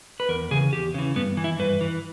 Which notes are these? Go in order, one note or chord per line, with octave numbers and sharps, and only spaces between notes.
B4
E2 A#4
C#3 E3 G#4
E2 G4
C#3 E3
G2 B3
E3
E4
G2 B4
E3